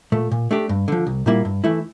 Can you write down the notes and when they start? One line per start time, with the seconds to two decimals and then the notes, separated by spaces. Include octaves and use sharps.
0.12 A#2 A3
0.31 A#2
0.51 A3 D4 G4
0.69 G2
0.88 D3 F3
1.07 C2
1.26 A#2 G3 A#3 E4
1.45 G2
1.64 E3 A3 E4